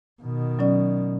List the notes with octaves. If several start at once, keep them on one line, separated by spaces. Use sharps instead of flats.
B2 D#3
F#3 C#4 D5